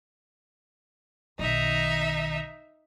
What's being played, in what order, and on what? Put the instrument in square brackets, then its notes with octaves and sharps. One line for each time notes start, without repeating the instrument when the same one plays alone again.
[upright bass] B1 D#3 [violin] D#4 E5